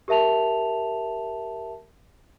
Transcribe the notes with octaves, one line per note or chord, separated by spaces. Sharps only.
G4 A#4 E5 A5 F7